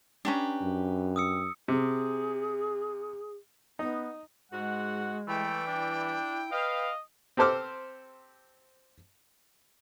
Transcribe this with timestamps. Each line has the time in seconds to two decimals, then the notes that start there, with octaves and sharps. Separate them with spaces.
0.25 C#4 D4 G4 B4 A#5
0.61 F#2
1.16 D#6 E6 C#7
1.68 C3 G#4
3.79 B3 D#4
4.52 G#2 G#3 F#4 F#5
5.28 E3 G3 A3 G5
5.67 D4 E4
6.52 B4 D#5 F5
7.37 C4 G4 A4 C5 D6 F6